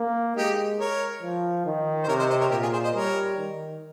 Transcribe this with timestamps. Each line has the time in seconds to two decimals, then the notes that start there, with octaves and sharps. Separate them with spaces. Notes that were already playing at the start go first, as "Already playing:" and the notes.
Already playing: A#3
0.37 G#3 D#4 G4
0.79 A#4 C#5
1.23 F3
1.66 D#3
2.04 C5
2.08 C3 A#4 C#5
2.19 C5 D#5
2.30 C5 D#5
2.41 A#4 C#5
2.51 A#2 G4 A#4
2.62 F4 G#4
2.73 G#4 C5
2.84 C5 D#5
2.94 G3 A#4 C#5
3.37 D#3